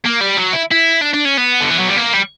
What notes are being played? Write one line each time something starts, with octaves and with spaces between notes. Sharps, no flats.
A#3
G3
F#3
E4
E4
D4
D4
C#4
B3
D3
E3
F#3
G3
A#3
G3